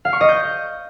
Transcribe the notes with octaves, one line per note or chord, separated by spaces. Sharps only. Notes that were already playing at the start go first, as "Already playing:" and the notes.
F5
C#6
D#5
G6